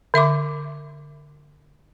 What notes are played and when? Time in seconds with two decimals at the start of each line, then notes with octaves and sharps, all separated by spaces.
0.14 D3 E5 C6 D6